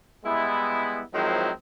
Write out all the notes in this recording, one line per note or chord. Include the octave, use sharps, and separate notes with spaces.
G3 G#3 B3 E4
D#3 F3 F#3 G#3 C4 E4